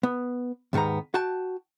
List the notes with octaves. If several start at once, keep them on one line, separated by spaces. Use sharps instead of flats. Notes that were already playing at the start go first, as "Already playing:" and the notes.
B3
D#2 G#2 D#3 B3 A#5
F#4 G5 A5